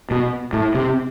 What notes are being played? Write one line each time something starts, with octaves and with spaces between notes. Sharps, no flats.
B2
A2
C3